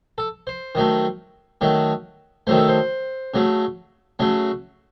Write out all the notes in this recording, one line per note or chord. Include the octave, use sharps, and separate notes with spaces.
A4
C5
D#3 F#3 A3
D#3 F#3 A3
D#3 F#3 A3 C5
A4
C5
C#3 F#3 A3
C#3 F#3 A3